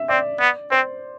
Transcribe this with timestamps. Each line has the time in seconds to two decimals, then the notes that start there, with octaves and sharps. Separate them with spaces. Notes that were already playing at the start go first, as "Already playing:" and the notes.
Already playing: E5
0.09 C4 D5
0.40 B3
0.71 C4 C5